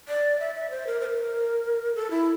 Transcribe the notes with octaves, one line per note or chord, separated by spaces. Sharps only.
D5
E5
E5
C5
A#4
C5
A#4
A4
E4